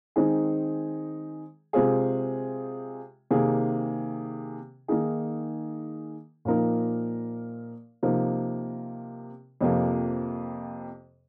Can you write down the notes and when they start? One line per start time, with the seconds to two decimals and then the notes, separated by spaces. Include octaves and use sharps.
0.16 D#3 G#3 C4 D#4 G#4
1.73 C3 G#3 C4 F4 G#4
3.31 C3 D#3 A#3 G#4
4.88 D#3 A#3 D#4 G#4
6.45 A#2 F3 A#3 D#4 A#4
8.03 C3 F3 A#3 D#4 A#4
9.61 F2 C3 F3 A#3